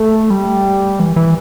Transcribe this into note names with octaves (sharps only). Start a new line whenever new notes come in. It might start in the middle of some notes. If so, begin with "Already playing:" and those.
Already playing: A3
G3
E3
E3